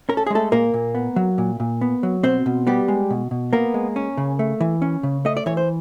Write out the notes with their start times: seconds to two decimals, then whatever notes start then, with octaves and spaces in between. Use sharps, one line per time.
0.09 C#4 A#4
0.17 A4
0.27 G#4
0.30 G#3 A3 A4
0.52 A#2 A#3 A#4
0.74 A#2
0.95 B3
1.16 F#3
1.38 A#2
1.60 A#2
1.81 B3
2.03 F#3
2.23 B2 C4 C5
2.46 B2
2.67 G3 B3 G4
2.88 G#3
3.10 B2
3.31 B2
3.53 A#3 B3 A#4
3.74 G#3
3.96 C#4
4.17 C#3
4.39 A3
4.61 E3
4.82 C#4
5.03 C#3
5.25 A3 D#5
5.37 D5
5.46 E3 C#5
5.57 C5